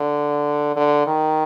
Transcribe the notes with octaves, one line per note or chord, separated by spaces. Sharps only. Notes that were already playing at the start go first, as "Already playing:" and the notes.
Already playing: D3
D3
D#3